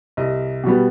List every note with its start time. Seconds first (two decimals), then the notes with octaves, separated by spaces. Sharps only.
0.17 C2 D#5
0.64 B2 G3 B3